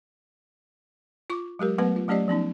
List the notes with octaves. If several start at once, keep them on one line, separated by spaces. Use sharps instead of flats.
F4 C#6 D6
F#3 G#3 G4 A#4
F#3 A3 B3 B4 F#5
F4
F#3 A3 C#4 G4 D5 D#5
F3 B3 C#4 D#4